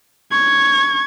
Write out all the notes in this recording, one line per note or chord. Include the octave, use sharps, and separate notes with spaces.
C#6 G#6